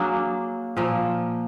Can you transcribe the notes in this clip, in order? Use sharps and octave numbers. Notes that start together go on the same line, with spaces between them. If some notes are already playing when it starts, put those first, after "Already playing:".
Already playing: F#3 A#3 D4 G#4
A#2 F3 A#3